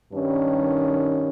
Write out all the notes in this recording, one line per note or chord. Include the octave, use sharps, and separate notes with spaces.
G2 D#3 C#4